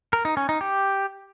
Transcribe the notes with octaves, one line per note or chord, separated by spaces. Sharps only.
A#4
D#4
C#4
D#4
G4